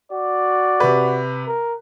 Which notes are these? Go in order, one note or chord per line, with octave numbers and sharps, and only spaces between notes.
F#4 D5
C3 B4
A#4